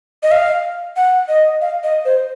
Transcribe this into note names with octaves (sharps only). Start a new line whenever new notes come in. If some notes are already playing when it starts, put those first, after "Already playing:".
D#5
F5
F#5
D#5
F5
D#5
C5